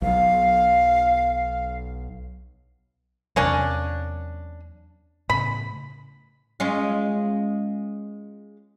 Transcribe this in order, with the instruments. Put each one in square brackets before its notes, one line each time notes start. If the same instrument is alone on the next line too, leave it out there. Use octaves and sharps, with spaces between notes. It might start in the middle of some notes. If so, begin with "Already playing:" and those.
[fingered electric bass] B1 F#3 [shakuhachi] F5
[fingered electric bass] E2 C3 F#3 [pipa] A#3 C#4 D4
[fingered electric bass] A2 C#3 [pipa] B5
[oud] G#3 C#4 F4